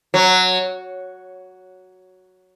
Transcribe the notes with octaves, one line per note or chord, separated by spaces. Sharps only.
F#3